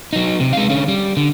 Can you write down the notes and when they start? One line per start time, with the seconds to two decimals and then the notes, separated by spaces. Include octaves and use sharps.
0.13 F#3 D#4
0.40 C3
0.53 G#3 F5
0.70 D3 C#4
0.88 G3
1.17 D3